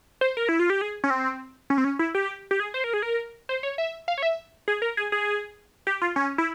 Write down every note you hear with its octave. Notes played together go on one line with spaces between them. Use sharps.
C5
A#4
E4
F4
G4
G#4
C#4
C4
C#4
C4
C#4
E4
G4
G4
G#4
C5
A#4
G#4
A#4
C5
C#5
E5
F5
C#5
E5
G#4
A#4
G#4
G#4
G4
F4
C#4
E4